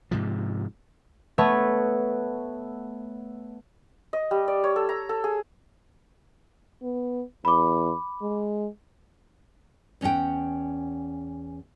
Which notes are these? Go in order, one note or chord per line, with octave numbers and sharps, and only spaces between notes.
G#2 C3 F3
A3 B3 B4 C#5
D#5
G3
D5
C#5
A4
A#5
A4
G#4
B3
E2 B5 D6
G#3
E2 C#4 D#5 F#5 G5